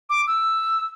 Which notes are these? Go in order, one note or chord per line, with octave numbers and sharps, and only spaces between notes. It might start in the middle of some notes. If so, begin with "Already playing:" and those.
D6
E6